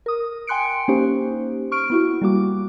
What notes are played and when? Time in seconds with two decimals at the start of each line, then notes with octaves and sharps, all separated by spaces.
0.06 A#4 D#6
0.47 G5 G#5 C6 F#6 C#7 D7
0.88 A#3 C#4 D#4 G4 C5
1.72 C#6 F6 D7
1.90 B3 E4 F#4
2.22 G3 A#3 F#4 D6